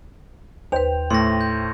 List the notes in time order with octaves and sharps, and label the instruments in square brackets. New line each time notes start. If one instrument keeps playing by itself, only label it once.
[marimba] D#2 B4 [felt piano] C5 G5 [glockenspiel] F7
[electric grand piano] A2 A3 [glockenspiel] C6 A#6
[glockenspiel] G6